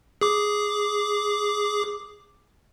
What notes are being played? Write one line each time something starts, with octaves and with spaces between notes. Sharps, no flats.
G#4 D6